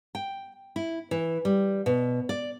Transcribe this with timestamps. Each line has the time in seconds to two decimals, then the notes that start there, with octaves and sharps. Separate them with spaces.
0.15 G5
0.76 E4
1.11 E3
1.45 G3
1.86 B2
2.29 D5